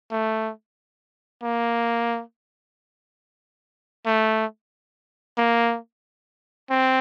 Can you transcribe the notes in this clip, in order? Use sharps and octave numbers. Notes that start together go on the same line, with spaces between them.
A3
A#3
A3
A#3
C4